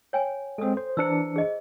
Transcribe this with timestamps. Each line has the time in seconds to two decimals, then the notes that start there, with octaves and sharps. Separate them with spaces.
0.13 C#5 G5 G#5
0.58 G#3 C4 A4 D#6
0.77 C5
0.97 E3 D4 E4 C5 E6 C#7
1.36 G#4 D#5